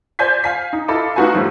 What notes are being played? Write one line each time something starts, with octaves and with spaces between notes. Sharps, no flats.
C5 D5 G#5 G6 G#6 B6
F5 G#5 B6
D#4
E4 F4 A4 D#5 B5 D6
A3 D#4 F4 F#4 B4 G#5
F#2 A2 D#3 F3 G3 A3